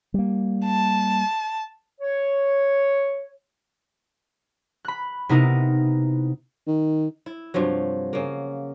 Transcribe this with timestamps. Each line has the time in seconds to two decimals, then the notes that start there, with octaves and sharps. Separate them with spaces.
0.14 G3 A#3
0.65 A5
2.01 C#5
4.85 B5 F#6
5.29 C3 B3 D#4 E4 A#4
6.67 D#3
7.26 E4
7.54 G2 C3 F3 F#3
8.13 C#3 A#3